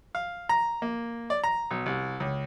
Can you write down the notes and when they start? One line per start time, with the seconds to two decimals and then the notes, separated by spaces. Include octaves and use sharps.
0.15 F5
0.49 A#5
0.82 A#3
1.30 D5
1.44 A#5
1.71 B1
1.86 C2
2.20 C#2